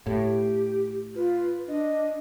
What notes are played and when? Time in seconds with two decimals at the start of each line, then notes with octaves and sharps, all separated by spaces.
0.06 A2 G4
1.15 F4 B4
1.68 D4 D#5